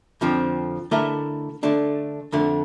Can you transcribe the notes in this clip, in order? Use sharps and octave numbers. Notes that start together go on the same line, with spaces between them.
F2 D3 F3 C4
D3 A3 E4 A#4 E5
D3 A3 D4
F2 D3 A3